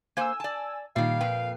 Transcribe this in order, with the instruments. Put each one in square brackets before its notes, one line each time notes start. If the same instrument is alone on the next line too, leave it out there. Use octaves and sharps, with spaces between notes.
[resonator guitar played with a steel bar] A#3 C5 [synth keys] G#5 E6
[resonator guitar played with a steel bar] D5 A5
[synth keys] A#2 C7 [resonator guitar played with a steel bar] D#3 G3 [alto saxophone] F5
[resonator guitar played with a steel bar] F2 B4 G5